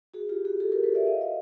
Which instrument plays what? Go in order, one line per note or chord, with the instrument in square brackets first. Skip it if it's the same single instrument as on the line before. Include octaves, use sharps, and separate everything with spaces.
[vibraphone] F#4 G#4
F4 G4
F#4 G#4
G4 A4
G#4 A#4
A4 B4
D5 E5
D#5 F5
D#5